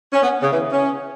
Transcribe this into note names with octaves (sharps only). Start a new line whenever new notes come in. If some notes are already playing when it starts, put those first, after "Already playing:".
C#4
B3
C#3
E3
C#4